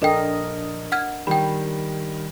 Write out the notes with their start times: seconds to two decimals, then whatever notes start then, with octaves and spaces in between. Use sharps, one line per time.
0.02 A#1 D4 A4 A#4 D#5 G5
0.92 F#5 F6 G#6
1.27 D#3 G3 G5 B5